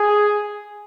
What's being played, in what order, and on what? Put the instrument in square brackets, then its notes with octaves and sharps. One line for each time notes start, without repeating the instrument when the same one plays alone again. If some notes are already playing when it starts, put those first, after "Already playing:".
Already playing: [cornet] G#4